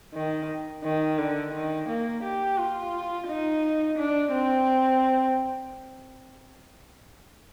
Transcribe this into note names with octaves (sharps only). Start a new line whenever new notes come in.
D#3
D#3
D3
D#3
A#3
G4
F4
D#4
D4
C4